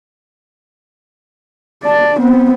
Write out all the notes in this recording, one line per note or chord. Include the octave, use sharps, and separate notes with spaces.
D5 A5
B3 C4